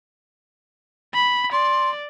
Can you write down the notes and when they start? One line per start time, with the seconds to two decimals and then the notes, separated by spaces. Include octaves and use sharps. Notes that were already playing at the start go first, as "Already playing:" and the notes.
1.14 B5
1.53 D5 C6